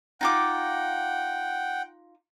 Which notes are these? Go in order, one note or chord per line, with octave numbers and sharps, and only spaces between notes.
D#4 F4 F#5 G5 D6